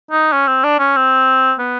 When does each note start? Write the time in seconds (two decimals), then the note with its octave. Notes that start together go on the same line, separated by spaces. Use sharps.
0.11 D#4
0.33 C#4
0.47 C4
0.64 D4
0.79 C#4
0.96 C4
1.59 B3